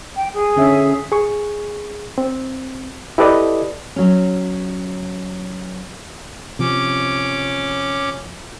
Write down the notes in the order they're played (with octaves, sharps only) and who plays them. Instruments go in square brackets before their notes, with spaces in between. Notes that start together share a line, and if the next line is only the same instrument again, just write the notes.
[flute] G5
G#4
[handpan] D3 C#4 E5
[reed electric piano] G#4 C#6
C4
E4 G4 A4 B4 D5 D#5
[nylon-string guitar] F#3 C#4
[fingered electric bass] C3 F3 [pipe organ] C#4 D6